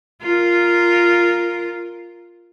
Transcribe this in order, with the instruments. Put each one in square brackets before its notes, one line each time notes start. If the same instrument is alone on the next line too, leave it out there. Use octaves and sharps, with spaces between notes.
[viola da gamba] F4 A#4